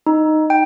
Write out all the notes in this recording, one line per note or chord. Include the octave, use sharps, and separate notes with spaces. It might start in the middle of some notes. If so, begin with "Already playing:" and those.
D#4
G5